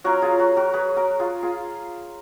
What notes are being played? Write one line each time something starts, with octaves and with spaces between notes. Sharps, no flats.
F#3 C#4 F4 F#4 A#4
F4 G#4
F#4
F#4 A#4
G#4 B4
F#4 A#4
F4 G#4
F4 G#4